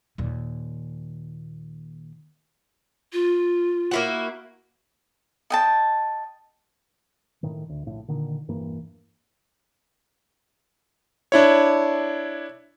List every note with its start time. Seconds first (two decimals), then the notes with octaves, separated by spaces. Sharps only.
0.18 D#2 A#2
3.13 F4
3.91 A#3 E4 F#4
5.50 D#5 G5 A5
7.43 A2 D#3
7.69 D2
7.86 A#1 A2
8.08 A#2 D3 D#3
8.48 E1 G2 E3 A#3
11.32 D4 E4 C#5